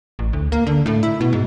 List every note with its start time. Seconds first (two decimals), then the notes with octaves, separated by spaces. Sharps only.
0.19 A1
0.33 D2
0.52 A#3
0.66 D3
0.86 A2
1.03 E4
1.20 B2
1.33 G#2